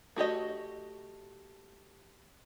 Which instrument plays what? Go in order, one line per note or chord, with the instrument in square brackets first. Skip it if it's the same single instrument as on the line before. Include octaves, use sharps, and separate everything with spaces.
[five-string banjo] A3 F#4 G4 D#5